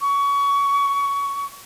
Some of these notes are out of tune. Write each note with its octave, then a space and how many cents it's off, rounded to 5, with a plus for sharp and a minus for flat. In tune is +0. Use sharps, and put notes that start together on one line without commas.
C#6 +25